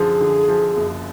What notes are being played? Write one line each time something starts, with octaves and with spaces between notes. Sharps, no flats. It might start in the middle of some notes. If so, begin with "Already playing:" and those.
Already playing: F#2 D3 F3 G#4
D3
F3
F#1